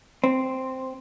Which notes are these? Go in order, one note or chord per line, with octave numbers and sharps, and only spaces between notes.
C4